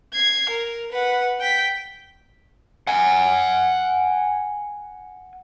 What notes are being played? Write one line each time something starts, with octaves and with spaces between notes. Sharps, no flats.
G#6 C7
A#4
B4 F#5
G5 B6
F#5 G#5